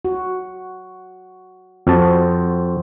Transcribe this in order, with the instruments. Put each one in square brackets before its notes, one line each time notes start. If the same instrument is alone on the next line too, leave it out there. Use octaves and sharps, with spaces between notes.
[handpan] F#4
[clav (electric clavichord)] F2 A5 [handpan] C4 F#4